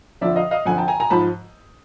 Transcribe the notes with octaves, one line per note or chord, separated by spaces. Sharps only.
F2 D3 F3 D5 E5
D#5 F5
D#5 F5
F2 D3 F3 F#5 G#5
G5 A5
G#5 A#5
G#5 A#5
G#2 F3 A5 B5